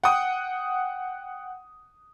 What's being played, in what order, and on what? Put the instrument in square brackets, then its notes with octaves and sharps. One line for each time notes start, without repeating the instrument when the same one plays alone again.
[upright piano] F#5 G5 D#6